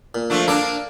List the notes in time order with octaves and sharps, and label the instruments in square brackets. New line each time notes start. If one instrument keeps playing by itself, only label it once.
[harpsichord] A#2
[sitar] F3 A3 D4
[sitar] A#3 D4 [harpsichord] A4 D5